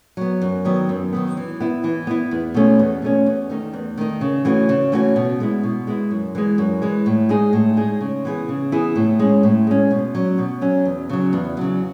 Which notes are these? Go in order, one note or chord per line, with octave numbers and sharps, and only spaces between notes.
F#3 B3
F#2
D#3 F#3 B3
F#2
D#3 F#3 B3
E3
B3 E4
E3
B3 E4
E2
B2 A3 C#4
E2
B2 A3 C#4
E2
D#3 A3 D#4
E2
D#3 A3 D#4
C#3
E3 A3 C#4 F#4
C#3
E3 A3 C#4 F#4
B2
G#3 B3 E4
B2
G#3 B3 E4
F#2
E3 G#3
F#2
E3 G#3
A2
G#3 D#4 G#4
A2
G#3 D#4 G#4
C#3
E3 B3 E4 G#4
C#3
E3 B3 E4 G#4
A2
G#3 C#4
A2
G#3 C#4
B2
F#3 C#4
B2
F#3 C#4
E2
C#3 F#3
E2
C#3 F#3